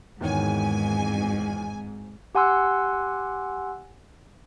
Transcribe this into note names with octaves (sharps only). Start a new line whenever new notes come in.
G#1 E2 G#2 D#3 C#5 G#5
G4 F#5 G#5 C6 E6 F#6